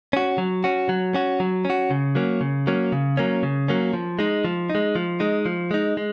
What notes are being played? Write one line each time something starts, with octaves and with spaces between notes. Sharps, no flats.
C#4 F#4
F#3
C#4 F#4
F#3
C#4 F#4
F#3
C#4
F#4
C#3
F#3 A#3 C#4
C#3
F#3 A#3 C#4
C#3
F#3 A#3 C#4
C#3
F#3 A#3 C#4
F3
G#3 D#4
F3
D#4
G#3
F3
G#3 D#4
F3
G#3 D#4
G#3